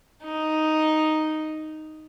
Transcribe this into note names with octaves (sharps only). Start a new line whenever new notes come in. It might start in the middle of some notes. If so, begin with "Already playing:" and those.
D#4